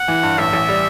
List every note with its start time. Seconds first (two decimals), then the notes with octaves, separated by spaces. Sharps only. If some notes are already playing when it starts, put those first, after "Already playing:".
Already playing: F#5
0.08 E3
0.23 G2
0.38 A1 E5
0.53 A1
0.69 G3